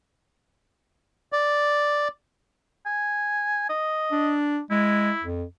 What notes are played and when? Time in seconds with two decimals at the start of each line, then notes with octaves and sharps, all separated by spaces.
1.33 D5
2.86 G#5
3.70 D#5
4.12 D4
4.71 G#3 E4
5.23 F2